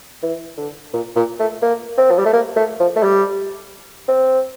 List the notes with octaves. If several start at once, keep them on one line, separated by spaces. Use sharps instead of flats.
E3
D3
A#2
A#2
A3
A#3
C4
F3
G3
A3
A#3
A3
F3
A3
G3
C4